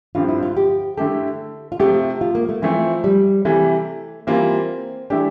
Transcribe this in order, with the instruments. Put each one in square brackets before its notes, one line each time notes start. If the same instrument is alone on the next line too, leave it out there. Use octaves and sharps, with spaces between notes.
[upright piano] G2 D3 F3 C4 [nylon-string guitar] F4
[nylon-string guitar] E4
F4
G4
[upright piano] D3 A3 E4 G4 [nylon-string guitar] A4
[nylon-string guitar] F4
[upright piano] C3 F3 A3 [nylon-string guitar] G4
[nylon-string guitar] F4
A#3
A3
[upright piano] E3 A3 C4 [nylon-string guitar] F3
[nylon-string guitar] G3
[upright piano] C3 E3 G3 [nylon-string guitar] A3
[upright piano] E3 G3 A#3 F4 [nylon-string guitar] C4
[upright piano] E3 A3 E4 G4 [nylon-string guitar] D4